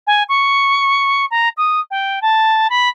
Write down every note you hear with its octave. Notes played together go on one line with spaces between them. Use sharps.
G#5
C#6
A#5
D#6
G5
A5
B5